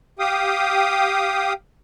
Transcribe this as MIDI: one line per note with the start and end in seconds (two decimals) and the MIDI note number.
0.19 1.53 67
0.19 1.53 77
0.19 1.53 79
0.19 1.53 87